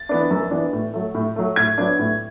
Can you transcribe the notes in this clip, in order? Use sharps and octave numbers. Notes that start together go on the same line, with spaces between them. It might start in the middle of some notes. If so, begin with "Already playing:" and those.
Already playing: A6
E3 B3 D4
F#2
E3 B3 D4
A2
F#3 A3
A2
F#3 A3
A2 G#6
F#3 B3 D4
A2